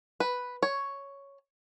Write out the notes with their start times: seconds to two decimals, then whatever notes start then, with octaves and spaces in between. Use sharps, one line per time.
0.20 B4
0.63 C#5